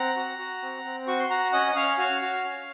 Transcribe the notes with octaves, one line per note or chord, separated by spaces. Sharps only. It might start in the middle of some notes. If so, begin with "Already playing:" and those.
Already playing: C4 F#5 A#5
F#4
F#4
C4
C4
F#4 C#6
C6
F#4 F#5 A#5
C#4 D#5 F#5
F#5
C#4 C#5 F5
F#4 C#5 F5
F#4
C#4